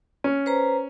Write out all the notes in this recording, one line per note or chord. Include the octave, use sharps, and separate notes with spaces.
C#4
B4 C5 A#5